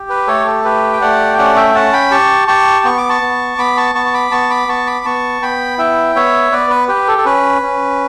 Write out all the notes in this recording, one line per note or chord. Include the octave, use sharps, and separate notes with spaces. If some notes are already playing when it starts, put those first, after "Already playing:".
Already playing: G4
B4
A3 A4 C#5
A4
G4 B4
G5
A3 D5 F#5
G5
C#4 D5 F#5
E5 G5
C#4 F#5 A5
G5 B5
G4 A5 C#6
G4 A5 C#6
B3 C#6
D6
A5 C#6
B3
B3 B5 D6
A5 C#6
B3 A5 C#6
C#6
B5 D6
B3 A5 C#6
B5 D6
B3 A5 C#6
B5 D6
B3 A5 C#6
B3 G5 B5
E4 E5 G5
B3 C#5 E5
B3 B4 D5
B4
G4 B4
A4
A4
C#4 B4
C#4